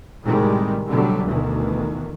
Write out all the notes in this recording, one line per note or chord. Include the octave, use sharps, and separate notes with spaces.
A2 C3 D#3 G3 G#3
B2 D3 F#3 G3 A3
D2 B2 D#3 E3